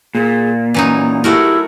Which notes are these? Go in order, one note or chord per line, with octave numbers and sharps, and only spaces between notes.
A#2 G#4
E3 F#3 C#4 D#4
A3 E4 F#4 G4 A#4